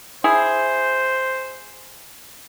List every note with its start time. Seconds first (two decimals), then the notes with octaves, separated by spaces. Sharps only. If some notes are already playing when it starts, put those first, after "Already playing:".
0.24 E4 G#4 C5